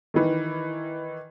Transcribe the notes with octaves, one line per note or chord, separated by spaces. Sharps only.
D#3 E3